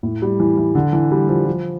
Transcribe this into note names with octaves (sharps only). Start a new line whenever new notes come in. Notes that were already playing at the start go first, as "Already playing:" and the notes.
A2
G3
E3
E3
D3
E3
G3
F3
F3